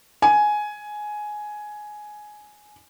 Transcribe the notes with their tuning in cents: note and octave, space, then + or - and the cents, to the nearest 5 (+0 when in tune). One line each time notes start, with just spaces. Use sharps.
G#5 +10